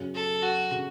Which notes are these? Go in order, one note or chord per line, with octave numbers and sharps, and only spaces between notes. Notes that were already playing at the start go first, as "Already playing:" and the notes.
Already playing: F#2 C#3 F#3
A4
F#4
C#3 F#3